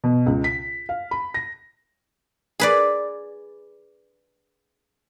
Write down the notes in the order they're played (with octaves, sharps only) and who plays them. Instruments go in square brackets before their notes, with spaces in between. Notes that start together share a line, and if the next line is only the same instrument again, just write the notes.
[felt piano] B2
C#2
B6
F5
B5
A#6
[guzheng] G#4 B4 D5